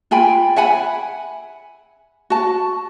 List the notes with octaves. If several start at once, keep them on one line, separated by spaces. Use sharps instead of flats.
F4 G5 G#5 B5
E5 F#5 G#5 B5
F#4 A5